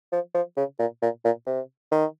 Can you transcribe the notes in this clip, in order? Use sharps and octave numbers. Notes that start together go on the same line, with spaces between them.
F3
F3
C#3
A#2
A#2
A#2
C3
D#3